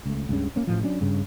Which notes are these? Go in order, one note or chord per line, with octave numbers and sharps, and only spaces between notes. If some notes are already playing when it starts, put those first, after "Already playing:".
C#2 A3
C#2 G2 C#3
A#3 C#4
A1 A2 F3
F#3 C#4 D4
G2 C#3